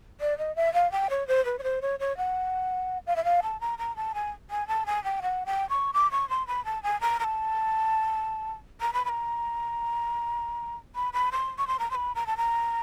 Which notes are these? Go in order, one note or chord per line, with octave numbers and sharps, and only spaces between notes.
D5
D#5
E5
F5
G5
C#5
C5
B4
C#5
C5
C#5
C#5
F#5
F5
E5
F5
A5
A#5
A#5
A5
G#5
G#5
A5
G#5
G5
F#5
G5
C#6
D6
C#6
C6
B5
A5
G#5
A#5
A#5
A5
A#5
B5
B5
A#5
B5
B5
C6
C#6
C6
A#5
C6
B5
A#5
A5
A#5